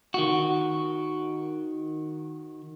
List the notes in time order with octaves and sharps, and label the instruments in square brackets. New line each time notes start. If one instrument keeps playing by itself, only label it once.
[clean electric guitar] D#3 F#4